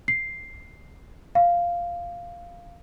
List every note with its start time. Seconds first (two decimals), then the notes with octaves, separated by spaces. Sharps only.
0.08 C7
1.35 F5